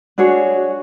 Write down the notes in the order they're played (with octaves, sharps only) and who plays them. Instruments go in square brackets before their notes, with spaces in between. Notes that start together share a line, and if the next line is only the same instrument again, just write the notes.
[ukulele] D4 F#4 G#4 C#5